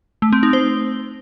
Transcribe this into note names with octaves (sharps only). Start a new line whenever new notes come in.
A3
C4
D#4
C5